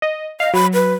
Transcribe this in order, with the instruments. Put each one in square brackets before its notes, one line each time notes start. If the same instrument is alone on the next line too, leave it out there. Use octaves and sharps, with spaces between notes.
[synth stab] D#5
[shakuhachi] D#5 [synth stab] F5
[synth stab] F#3 [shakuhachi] B5
[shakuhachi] B4